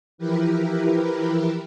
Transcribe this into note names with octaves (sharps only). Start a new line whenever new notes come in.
E3 F3 E4 G4 A#4 B4